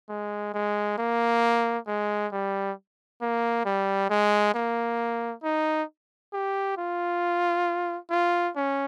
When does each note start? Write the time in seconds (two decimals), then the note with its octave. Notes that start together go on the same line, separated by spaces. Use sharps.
0.10 G#3
0.54 G#3
0.98 A#3
1.87 G#3
2.32 G3
3.22 A#3
3.65 G3
4.10 G#3
4.55 A#3
5.43 D#4
6.33 G4
6.78 F4
8.11 F4
8.56 C#4